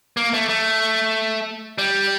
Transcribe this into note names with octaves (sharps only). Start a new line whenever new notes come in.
A#3
A3
A3
G3